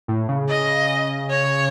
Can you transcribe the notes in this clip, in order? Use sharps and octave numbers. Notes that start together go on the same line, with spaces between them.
A2
C#3
D#5
C#5